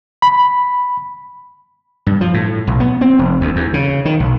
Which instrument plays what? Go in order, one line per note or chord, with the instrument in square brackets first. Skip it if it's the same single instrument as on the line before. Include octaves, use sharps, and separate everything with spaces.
[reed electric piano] B5
[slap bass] G2
F3
A2
B1
B3
C4
F1
D2
E2
C#3
D#3
B1